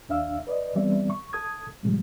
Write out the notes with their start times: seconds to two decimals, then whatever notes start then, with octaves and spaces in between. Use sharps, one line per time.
0.09 D#2 D4 E5 F5 E6
0.47 B4 D5 D#5
0.75 E3 G3 B3 C4 D5 E5
1.10 C#6
1.33 A4 A5 D#6 G#6
1.83 A2 C3 D#3 F3 G3 G#3